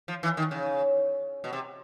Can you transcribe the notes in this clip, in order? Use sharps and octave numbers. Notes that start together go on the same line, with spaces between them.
F3
E3
D#3
C#3
B2
C3